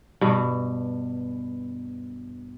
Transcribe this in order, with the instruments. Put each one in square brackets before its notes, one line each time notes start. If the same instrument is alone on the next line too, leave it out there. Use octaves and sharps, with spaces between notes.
[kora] G2 B2